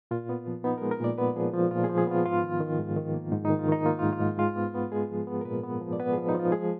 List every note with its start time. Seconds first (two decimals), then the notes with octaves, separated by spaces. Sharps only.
0.11 A#2 F4
0.29 B3
0.47 F3
0.64 B3 D#4
0.78 G#3 A#4
0.91 A#4
1.00 A#2 D5
1.18 B3 B4
1.36 F3 G#4
1.53 F3 F4
1.71 A#2 F4
1.84 G#4
1.90 F3
1.98 G#4
2.07 B3 F4
2.25 G#2 F4
2.43 D#3
2.60 D#3
2.79 G#2
2.96 D#3
3.14 A#3
3.32 G#2 D#4
3.45 D#3 D#4
3.59 F4
3.68 D#3 D#4
3.86 A#3 F4
3.99 G#2 F4
4.13 F4
4.20 G#2
4.39 G#3 F4
4.56 B3
4.75 B3
4.92 G#3 G#4
5.10 F3
5.27 B3
5.41 A#4
5.45 A#2 B4
5.64 B3
5.81 F3
5.93 D5
6.00 B3 B4
6.13 F3 G#4
6.29 D#4
6.35 F3 F4
6.52 G#3 G#4